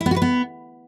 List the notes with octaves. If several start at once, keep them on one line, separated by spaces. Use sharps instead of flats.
E4
B3
F#4
B4
B3